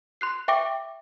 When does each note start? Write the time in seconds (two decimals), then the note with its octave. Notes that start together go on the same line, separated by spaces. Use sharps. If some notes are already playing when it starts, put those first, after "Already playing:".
0.21 C6 F#6 C7
0.48 E5 G5 C#6 D6 A#6 D7